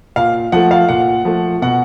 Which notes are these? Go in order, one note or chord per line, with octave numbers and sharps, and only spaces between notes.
A#2 F5
F3 A3 F#5
F5
A#2 F#5
F3 A3
B2 F#5